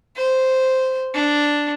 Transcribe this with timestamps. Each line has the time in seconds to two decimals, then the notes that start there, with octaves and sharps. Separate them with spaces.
0.16 C5
1.14 D4